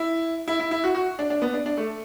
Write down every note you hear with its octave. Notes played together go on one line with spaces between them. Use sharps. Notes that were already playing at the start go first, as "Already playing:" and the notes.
Already playing: E4
E4
E4
E4
F#4
F#4
D4
D4
B3
D4
D4
A3